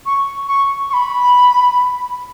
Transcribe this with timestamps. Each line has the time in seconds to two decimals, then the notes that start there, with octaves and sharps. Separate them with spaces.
0.06 C#6
0.48 C#6
0.90 C#6
0.93 B5